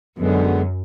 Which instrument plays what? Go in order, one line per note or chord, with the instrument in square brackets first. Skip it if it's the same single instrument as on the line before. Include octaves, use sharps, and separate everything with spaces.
[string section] F#2 [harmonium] D3 G#3 B3